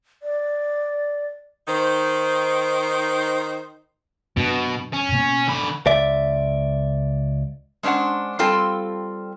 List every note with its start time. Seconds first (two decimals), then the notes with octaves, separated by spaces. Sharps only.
0.23 D5
1.68 D#3 D#4 C5
4.37 F#2 B2 D4
4.93 C#4
5.12 B2 A#3 B3
5.47 D3 B5
5.86 C#2 D5 E5
7.83 G#3 C#4 D4 C5 F#5
8.39 G3 C4 F4 A4 G5